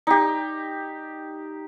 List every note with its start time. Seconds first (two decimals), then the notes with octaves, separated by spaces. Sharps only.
0.07 D#4 G4